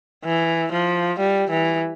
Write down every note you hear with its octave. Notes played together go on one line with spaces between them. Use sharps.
E3
F3
G3
E3